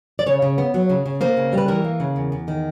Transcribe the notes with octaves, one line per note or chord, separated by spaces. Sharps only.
D5
C#3 C#5
C#3
B3
F#3
C#3
C#3
A#3 C5
C#3
G3 B4
E3 A#4
A#3
C#3
E2
E2
D#3